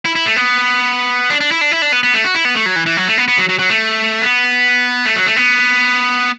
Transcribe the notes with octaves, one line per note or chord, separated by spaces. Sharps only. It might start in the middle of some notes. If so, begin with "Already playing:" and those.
E4
E4
A3
B3
D4
D4
E4
D4
E4
D4
B3
B3
A3
F#4
E4
B3
A3
F#3
E3
E3
F#3
A3
B3
B3
F#3
F#3
F#3
A3
B3
A3
F#3
A3
B3